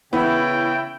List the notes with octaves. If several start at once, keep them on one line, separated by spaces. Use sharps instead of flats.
C#3 E3 B3 E4 G5